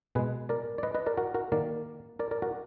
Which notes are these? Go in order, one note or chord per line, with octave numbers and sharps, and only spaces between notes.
B2 G#3 G#4 B4
A#4 D5
D5
B4 D#5
B4 D#5
A#4 D5
F#4 A#4
F#4 A#4
D#3 A#3 A#4 D5
A#4 D5
A#4 D5
F#4 A#4